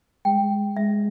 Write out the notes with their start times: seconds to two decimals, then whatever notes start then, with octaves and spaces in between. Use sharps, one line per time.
0.25 G#3 G5
0.77 G#3 E5